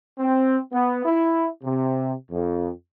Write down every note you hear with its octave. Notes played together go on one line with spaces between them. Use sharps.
C4
B3
E4
C3
F2